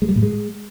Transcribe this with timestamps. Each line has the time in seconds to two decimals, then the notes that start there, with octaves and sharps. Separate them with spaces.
0.02 G#3
0.09 G3
0.16 A2
0.23 G#3